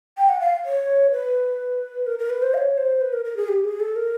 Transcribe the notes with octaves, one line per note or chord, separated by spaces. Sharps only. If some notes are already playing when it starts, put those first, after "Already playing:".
G5
F#5
F5
C#5
B4
A#4
A#4
B4
C5
F5
C#5
C5
B4
A#4
A#4
G#4
G4
G#4
A4
A#4